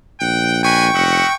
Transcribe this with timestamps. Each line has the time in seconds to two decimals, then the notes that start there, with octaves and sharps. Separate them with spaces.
0.21 A#1 F#5 G5
0.63 B4 D#5 G5 G#5 C#6
0.94 F1 D#5 E5 F#5